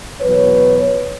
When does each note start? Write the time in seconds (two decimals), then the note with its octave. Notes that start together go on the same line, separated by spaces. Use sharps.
0.21 E2 B2 F#3 B4 C#5